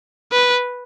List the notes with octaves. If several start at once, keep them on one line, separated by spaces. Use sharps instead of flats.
B4